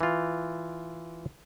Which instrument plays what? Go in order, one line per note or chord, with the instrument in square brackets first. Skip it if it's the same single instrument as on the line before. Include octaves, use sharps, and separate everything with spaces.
[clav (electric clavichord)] E3 F4